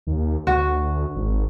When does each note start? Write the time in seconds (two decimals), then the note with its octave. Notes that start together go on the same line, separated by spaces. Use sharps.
0.07 D#2
0.47 D2 F#4
1.16 G#1